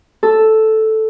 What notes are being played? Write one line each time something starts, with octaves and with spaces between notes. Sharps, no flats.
A4